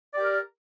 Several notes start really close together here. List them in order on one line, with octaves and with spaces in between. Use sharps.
D5 G4 A#4